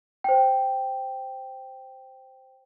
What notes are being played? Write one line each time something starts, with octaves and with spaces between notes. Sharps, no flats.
C5 G5